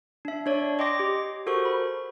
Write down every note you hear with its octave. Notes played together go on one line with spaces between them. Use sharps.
D4 E5
D4 C#5 D5
D#5 G5 C6 D6 A#6
G4
F#4 A4 A#4 C5 C#6
B5